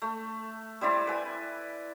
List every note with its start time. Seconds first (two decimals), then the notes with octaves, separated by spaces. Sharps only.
0.02 A3
0.81 G3 C4 E4 D5
1.07 B4 G#5